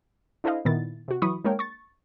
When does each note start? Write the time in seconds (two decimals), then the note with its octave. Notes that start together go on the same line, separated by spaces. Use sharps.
0.44 D4 E4 A4 C5 D#5 F5
0.65 A#2 D#3 B3 E4 A6
1.08 C3 F#4
1.22 E3 F#3 E4 B5 C#6 D#6
1.45 G#3 A#3 D4 A#4 C#5 G5
1.59 C#6 A6